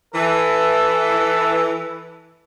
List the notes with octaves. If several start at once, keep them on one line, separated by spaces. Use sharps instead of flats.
E3 A4